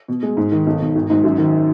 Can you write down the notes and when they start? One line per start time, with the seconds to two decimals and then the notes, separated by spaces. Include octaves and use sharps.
0.08 B2
0.23 G#3
0.37 G#2
0.52 D#3
0.67 B1
0.80 B2
0.95 G#1
1.10 G#2
1.24 F#2
1.38 D#3